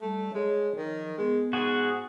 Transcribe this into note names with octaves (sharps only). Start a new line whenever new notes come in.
G3 A3
G#3 C#5
D#3 F3
G#3 B3
G#2 F#4 G#4